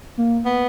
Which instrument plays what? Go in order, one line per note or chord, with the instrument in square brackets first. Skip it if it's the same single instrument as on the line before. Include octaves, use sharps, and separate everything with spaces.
[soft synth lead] A#3
[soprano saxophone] B3